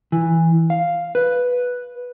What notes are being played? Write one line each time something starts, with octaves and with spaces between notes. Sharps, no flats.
E3
F5
B4